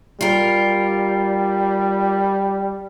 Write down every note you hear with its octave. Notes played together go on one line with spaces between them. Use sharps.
G3 F4 A#4